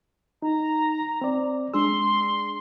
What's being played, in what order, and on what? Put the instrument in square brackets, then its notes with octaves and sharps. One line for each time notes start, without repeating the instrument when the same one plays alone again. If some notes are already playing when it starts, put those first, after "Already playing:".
[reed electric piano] D#4 [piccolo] A#5
[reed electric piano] C4 D5
[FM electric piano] G#3 D4 G#4 [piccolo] C6 [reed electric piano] E6